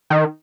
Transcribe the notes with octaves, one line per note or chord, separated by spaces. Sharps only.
D#3